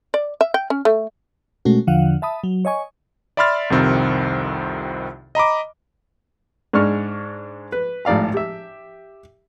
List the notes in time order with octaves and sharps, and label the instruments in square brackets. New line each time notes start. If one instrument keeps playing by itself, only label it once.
[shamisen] D5
E5
G5
C#4
A3
[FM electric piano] B2 G#3 A3 C#4 F#4
E2 D3 F3 F5 F#5
E5 A5 B5 D#6
F#3
C#5 D#5 G#5 C#6
[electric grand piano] D5 E5 B5 C6 F6 A6
C2 F2 C3 D#3 C4
D#5 A#5 B5 D6
[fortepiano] G#2 G#3 D4 G#4 C#6 F6
B4
G#1 A2 D5 F5 A#5
G4 E5